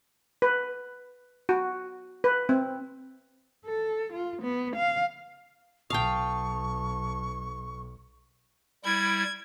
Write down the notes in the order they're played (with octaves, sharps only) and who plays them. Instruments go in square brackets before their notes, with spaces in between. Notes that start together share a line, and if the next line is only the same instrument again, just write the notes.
[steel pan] B4
F#4
B4
C4
[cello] A4
F4
B3
F5
[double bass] B1 [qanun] F5 G5 [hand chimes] A5 D#6 [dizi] C#6
[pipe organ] G3 E4 [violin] G#6